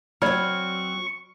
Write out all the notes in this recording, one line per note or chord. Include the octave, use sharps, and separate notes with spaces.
F#3 C4 D5 B5 C#6 F6